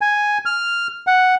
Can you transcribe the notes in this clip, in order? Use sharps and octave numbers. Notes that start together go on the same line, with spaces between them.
G#5
F6
F#5